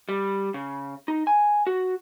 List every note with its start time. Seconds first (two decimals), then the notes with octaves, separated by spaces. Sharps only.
0.09 G3
0.54 C#3
1.08 D#4
1.27 G#5
1.67 F#4